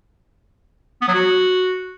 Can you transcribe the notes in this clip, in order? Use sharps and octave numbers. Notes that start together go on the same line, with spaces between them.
B3
F#3
F#4